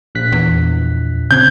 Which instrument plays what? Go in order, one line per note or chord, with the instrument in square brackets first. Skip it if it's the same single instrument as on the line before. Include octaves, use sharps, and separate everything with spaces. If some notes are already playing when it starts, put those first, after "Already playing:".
[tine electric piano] A#1 F#6 B6
[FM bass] E2
[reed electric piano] C#3 C4 G#6 [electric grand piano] G6